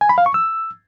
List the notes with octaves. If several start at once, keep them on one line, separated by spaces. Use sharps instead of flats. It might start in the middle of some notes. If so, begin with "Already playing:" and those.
G#5
B5
F5
C#6
E6